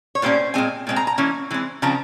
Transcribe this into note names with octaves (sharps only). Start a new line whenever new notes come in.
C#5
A#2 G3 A#3 C#4 C5
A#2 G#3 C4 G#5
A#2 G#3 C4
A#5
A#5
E3 A#3 C#4
E3 G#3 C4
C#3 F3 C4 A#5